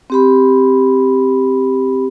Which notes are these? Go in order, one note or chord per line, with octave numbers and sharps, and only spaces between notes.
C4 G4 B5